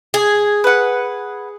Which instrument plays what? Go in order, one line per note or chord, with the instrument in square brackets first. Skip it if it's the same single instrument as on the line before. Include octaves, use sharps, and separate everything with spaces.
[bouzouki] G#4
[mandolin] B4 F#5